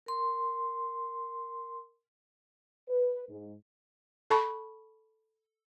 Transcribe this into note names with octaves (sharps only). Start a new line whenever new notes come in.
A#4 C6
B4
G#2
A4 A5 B5 C#6